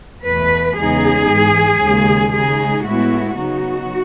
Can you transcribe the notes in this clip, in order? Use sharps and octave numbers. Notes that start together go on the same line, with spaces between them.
E2 B2 A3 B4
E2 C#3 G#3 B3 D#4 G#4
G#2 E3 G#3
D#2 C#3 G#3
C#3 G#3 D#4 G#4
A2 G#3 B3 E4 F#4
C#3 F#3 B3 D#4 F#4